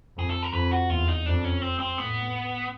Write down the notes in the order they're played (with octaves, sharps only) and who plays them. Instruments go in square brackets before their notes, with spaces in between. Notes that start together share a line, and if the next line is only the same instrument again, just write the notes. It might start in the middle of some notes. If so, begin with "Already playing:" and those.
[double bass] F2 [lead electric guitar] G#4
[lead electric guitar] A4
A#4
[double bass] F2 [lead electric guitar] B4
[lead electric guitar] F#4
[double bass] E2 [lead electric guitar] F4
[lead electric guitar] D#4
[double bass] F2 [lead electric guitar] D4
[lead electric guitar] C#4
C4
C4
[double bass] A2 [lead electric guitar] B3